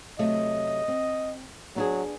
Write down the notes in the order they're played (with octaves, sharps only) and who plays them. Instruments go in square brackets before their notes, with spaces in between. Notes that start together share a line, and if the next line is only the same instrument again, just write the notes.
[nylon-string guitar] C3 F#3 A3 [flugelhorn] D#5
[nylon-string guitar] C4
[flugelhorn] F#3 [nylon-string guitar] B3 D4 G#4